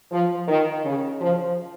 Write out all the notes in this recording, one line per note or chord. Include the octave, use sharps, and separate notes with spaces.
F3
D#3
C#3
F3